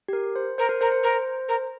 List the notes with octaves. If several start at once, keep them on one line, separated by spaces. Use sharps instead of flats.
G4
A#4
C5
A#4 C5
A#4
A#4 C5
C5
A#4
A#4